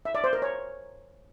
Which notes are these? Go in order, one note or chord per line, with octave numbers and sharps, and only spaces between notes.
E5
D5
C5
A#4
C#5